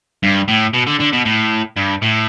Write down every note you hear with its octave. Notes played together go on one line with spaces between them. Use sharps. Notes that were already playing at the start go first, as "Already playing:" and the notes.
G2
A2
B2
D3
D3
B2
A2
G2
A2